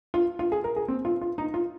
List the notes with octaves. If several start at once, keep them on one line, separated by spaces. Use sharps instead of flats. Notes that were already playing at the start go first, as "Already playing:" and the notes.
F4
F4
G#4
A#4
G#4
C4
F4
F4
D#4
F4